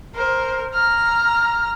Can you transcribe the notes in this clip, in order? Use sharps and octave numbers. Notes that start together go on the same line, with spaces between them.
A#4 C5
A#5 F6